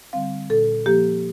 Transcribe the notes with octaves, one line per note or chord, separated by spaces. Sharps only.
D3 G3 C4 F5
A#2 A4
F3 A#3 G4